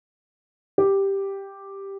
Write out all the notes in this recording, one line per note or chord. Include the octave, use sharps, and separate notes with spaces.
G4